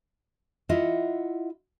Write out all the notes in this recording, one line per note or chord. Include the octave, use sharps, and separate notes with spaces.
E4 F4 D#5 E5 F#5